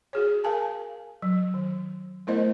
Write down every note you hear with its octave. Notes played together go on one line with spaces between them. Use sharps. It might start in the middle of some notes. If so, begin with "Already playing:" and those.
F#4 G#4 C#5
A#4 F5 G#5 A5
F#3
D#3
A3 B3 E4 A#4 C5 D#5